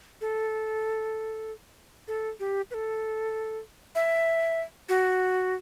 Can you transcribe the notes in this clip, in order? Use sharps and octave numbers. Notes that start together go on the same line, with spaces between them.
A4
A4
G4
B4
A4
E5
F#4